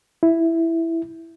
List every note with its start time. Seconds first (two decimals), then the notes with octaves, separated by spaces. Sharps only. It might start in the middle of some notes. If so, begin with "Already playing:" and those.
0.23 E4